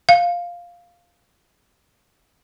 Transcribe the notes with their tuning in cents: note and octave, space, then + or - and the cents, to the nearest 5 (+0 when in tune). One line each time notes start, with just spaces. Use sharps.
F5 +0